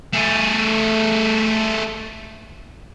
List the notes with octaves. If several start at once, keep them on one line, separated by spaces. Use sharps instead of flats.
A3 G#4